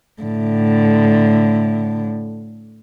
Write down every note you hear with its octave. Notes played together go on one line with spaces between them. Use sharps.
A2 D3